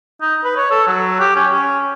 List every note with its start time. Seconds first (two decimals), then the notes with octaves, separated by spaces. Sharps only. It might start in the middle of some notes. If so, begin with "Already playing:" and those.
0.21 D#4
0.44 B4
0.57 C#5
0.71 A4
0.87 F#3
1.20 G4
1.36 C#4
1.53 C#4